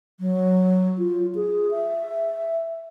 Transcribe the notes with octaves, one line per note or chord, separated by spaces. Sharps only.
F#3
F4
G#4
E5